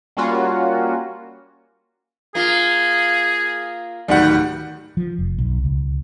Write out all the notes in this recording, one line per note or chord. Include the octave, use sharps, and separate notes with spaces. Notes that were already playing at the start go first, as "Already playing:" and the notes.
G3 A#3 C#4 F4 F#4
A#3 F4 G#4
D1 D#3 G3 F#5
F3
F1
B1
C#2